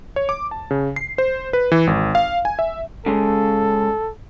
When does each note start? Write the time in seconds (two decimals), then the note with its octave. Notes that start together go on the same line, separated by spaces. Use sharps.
0.16 C#5
0.29 D6
0.51 A5
0.71 C#3
0.96 C7
1.18 C5
1.53 B4
1.72 E3
1.87 G#1
2.15 F5
2.45 G#5
2.59 E5
3.06 C#3 G#3 A4